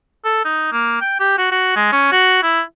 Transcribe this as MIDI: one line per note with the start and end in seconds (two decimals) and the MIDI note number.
0.25 0.43 69
0.45 0.72 63
0.72 0.98 58
1.01 1.16 79
1.20 1.37 67
1.38 1.49 66
1.52 1.72 66
1.76 1.90 56
1.92 2.10 61
2.12 2.40 66
2.43 2.61 64